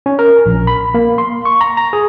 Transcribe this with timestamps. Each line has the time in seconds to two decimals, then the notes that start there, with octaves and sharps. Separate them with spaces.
0.06 C#4
0.19 A#4
0.46 A#1
0.67 B5
0.94 A#3
1.18 C6
1.45 C#6
1.61 A#5
1.77 A#5
1.93 G#4